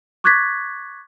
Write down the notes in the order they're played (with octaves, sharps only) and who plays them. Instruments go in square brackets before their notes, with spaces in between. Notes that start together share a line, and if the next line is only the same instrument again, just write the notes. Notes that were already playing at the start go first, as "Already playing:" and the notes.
[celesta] C#6 D6 F#6 G#6 A6 B6